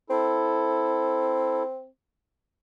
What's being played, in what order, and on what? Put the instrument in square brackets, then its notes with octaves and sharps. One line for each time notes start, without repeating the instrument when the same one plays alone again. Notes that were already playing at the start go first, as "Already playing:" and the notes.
[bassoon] C4 [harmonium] E4 A4